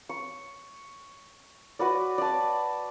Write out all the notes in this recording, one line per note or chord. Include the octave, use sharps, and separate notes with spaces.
C#6
F#4 B4 D5
D5 A5